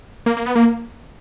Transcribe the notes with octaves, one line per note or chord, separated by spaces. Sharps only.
A#3
A#3
B3
A#3